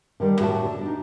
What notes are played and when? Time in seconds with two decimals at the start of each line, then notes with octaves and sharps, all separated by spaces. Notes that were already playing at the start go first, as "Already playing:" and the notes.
0.20 D3 D#3 G3
0.40 A2 F#4 G4 F#5 A5
0.65 D3
0.81 D4 D#4